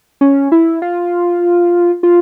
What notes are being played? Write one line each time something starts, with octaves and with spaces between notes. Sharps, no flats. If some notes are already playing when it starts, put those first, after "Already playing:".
C#4
E4
F4
F4